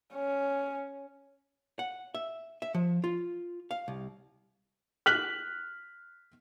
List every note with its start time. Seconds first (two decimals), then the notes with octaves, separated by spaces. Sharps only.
0.14 C#4
1.79 F#5
2.15 E5
2.62 E5
2.74 F3
3.04 F4
3.71 F5
3.88 C2
5.06 F6 F#6 B6 F#7